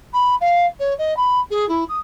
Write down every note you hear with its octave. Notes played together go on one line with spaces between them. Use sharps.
B5
F5
C#5
D#5
B5
G#4
E4
D#6